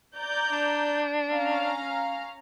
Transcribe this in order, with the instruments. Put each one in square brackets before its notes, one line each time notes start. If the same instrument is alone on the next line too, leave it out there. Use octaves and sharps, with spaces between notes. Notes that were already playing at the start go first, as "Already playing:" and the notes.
[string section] D5 A#5 G6
[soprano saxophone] D4
[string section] C#4 F5 A#5